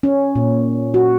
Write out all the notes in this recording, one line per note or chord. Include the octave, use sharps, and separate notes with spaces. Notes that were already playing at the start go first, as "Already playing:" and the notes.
C#4
A#2
F#4